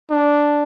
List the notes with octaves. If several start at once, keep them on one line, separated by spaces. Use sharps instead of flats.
D4